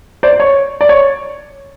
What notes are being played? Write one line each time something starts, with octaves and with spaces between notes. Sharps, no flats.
C5 D5
C#5
D5
C#5